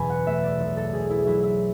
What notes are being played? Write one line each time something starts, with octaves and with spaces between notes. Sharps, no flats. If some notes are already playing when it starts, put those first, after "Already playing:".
Already playing: F#1 E2 B2 G#5 B5
F#5
A3 E5
D5
B1
A4
B2 G#4
E4
F#3 E4
E4